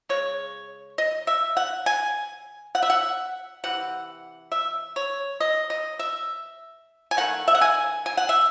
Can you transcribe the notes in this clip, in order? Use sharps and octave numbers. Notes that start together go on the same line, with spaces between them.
C#3 G#3 C#5
D#5
E5
F#5
G#5
F#5
E5
F#5
C3 E3 F#5
E5
C#5
D#5
D#5
E5
G#5
D#3 A3 F#5
E5
F#5
G#5
G#5
F#5
E5